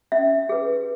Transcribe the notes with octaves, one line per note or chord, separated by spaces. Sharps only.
C#4 E5
G#4 B4